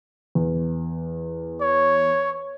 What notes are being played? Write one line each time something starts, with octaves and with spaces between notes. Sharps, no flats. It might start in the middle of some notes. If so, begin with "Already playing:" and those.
E2
C#5